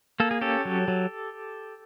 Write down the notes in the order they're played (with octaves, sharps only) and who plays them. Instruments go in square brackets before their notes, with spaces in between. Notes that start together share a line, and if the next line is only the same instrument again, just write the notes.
[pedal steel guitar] A#3 A4
G#4
C#4 G4 A4
F#3
F#3